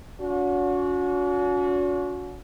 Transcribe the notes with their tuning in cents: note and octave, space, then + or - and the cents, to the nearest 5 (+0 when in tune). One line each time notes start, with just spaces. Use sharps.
C#4 +45 F#4 -30